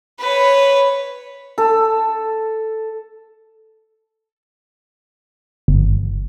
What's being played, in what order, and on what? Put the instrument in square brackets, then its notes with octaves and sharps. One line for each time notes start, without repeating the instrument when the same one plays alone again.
[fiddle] B4 C#5
[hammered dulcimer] A4
[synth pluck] G1